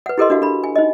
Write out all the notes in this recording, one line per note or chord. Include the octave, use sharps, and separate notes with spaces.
B4 F#5
E4 G4 A4 A#4 D#5 C6
D4 F#4 F5
D4 B5
G#5
D#4 D#5